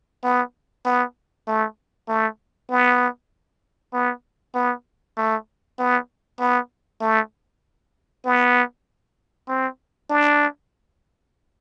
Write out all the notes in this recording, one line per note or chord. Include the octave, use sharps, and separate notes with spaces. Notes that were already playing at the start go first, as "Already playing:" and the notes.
B3
B3
A3
A3
B3
B3
B3
A3
B3
B3
A3
B3
C4
D4